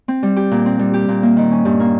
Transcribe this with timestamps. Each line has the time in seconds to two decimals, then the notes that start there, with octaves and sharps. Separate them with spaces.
0.08 C4
0.23 G3
0.36 G4
0.51 A#2
0.66 C4
0.79 G3
0.94 G4
1.08 A#2
1.23 A#3
1.37 D#3
1.51 C#4
1.65 G2
1.80 A#3